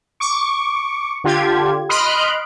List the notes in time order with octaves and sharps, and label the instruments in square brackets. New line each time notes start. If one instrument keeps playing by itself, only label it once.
[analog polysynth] C#6 D6
D3 F4 G4 G#6
D#5 B5 C6 F6 F#6 D7